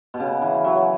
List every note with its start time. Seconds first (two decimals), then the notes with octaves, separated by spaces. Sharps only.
0.14 B2
0.20 C#3
0.42 E3
0.64 F#3